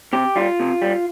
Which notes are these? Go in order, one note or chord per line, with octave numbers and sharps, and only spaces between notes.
C3 G4
G3 F4
C3
G3